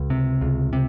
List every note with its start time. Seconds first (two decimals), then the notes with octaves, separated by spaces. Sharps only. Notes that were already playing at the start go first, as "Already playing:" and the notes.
Already playing: C#2
0.10 C3
0.41 C#2
0.73 C3